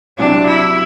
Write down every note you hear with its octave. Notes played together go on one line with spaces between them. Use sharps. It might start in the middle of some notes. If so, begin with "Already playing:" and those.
C2 C3 F#3 C4 D4 G4
E4